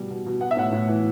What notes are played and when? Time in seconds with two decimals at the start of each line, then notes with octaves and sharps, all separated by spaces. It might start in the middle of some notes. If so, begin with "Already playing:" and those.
Already playing: B2 G3
0.11 B2
0.26 B2
0.41 B3 F#5
0.51 E5
0.57 A2 F#5
0.72 A2
0.89 E3